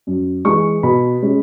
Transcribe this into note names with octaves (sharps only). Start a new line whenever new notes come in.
F#2
E3 G#3 C#6
B2 B5
G#3 C#4